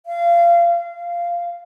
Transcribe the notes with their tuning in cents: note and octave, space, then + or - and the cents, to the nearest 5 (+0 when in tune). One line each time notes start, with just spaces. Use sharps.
F5 -25
F5 -10